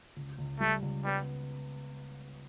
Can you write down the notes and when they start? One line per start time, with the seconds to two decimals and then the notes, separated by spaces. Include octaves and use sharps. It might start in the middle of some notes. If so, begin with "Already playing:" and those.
0.16 C#2
0.38 C#2
0.60 G3 A3
0.82 C#2
1.05 G3 B3